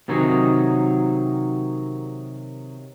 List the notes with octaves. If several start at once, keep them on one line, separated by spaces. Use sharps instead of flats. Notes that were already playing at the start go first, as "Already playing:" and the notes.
C3 D#3 F#3 D#4 G#4